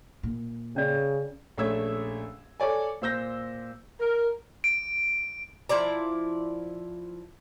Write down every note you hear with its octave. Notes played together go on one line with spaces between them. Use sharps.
A#2
C#3 C#4 D5
A#1 A3 C#4 E6 G#6
A4 C#5 D5 G#5
A#2 C5 E6 G6 A#6
A#4
D7
F3 E4 D5 A#5